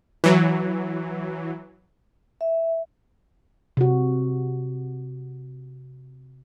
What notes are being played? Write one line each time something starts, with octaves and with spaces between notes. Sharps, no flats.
E3 F#3
E5
C3 F#4